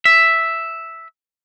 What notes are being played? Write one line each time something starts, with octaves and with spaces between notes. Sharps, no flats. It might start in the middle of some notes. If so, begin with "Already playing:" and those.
E5